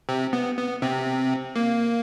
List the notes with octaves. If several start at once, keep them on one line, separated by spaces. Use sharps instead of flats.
C3 C4
B3
B3
C3 C4
A#3